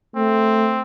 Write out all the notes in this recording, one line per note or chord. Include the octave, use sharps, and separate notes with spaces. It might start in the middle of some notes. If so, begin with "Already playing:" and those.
A3 C4